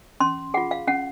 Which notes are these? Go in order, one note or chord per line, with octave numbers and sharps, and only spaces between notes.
C#4 C6
F4 G#4 F#5
F5
C#4 F#5